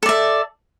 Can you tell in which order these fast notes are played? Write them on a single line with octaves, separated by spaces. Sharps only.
A4 D5 E5